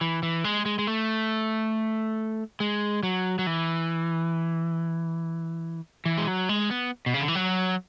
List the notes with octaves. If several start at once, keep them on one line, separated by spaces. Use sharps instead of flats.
E3
E3
G#3
G#3
G#3
A3
G#3
F#3
F#3
E3
E3
G#3
F#3
G#3
B3
B2
C#3
D3
E3
F#3